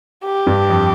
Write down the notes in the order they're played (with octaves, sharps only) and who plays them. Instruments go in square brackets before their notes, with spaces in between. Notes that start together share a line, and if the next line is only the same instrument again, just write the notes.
[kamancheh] G4
[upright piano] G2
F2